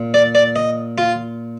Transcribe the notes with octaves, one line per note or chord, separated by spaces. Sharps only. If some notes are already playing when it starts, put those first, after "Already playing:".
Already playing: A#2
D5
D5
D#5
F4